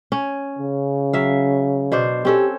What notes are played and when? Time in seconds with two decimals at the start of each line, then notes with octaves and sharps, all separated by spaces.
0.12 C#4
0.59 C#3
1.13 F#3 E5 F5
1.92 B2 D4 C5
2.25 C4 C#4 G4 A4